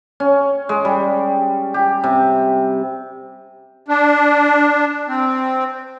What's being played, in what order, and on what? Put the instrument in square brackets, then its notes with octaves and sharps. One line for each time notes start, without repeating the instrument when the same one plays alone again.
[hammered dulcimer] C#4
G#3
G3
G4
C3
[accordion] D4
C4